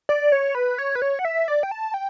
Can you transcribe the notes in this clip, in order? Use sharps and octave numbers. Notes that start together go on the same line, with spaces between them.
D5
C#5
B4
C#5
B4
C#5
F#5
E5
D5
G5
A5
G5